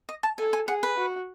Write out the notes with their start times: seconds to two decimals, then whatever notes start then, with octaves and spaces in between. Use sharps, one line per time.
0.09 D#5
0.23 A5
0.38 A4 G#5
0.53 G#5
0.68 G#4 F#5
0.83 B4
0.97 F#4